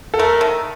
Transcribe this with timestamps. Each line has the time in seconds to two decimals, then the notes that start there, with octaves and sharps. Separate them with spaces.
0.14 A4
0.19 A3 A#4
0.41 D#3